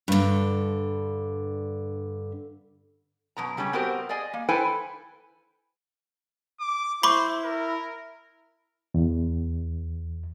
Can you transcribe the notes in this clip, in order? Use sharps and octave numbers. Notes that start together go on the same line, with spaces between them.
G2 D3
F#2 B2 A#5
C#3 G3 A3 C#4
B3 C4 F#4 G4 A#4 C5
G#4 D5 D#5 G#5
A#3
E4 A4 B4 C5 G5 G#5
D6
E4 C5 B5 C#6 D6
A#4
E2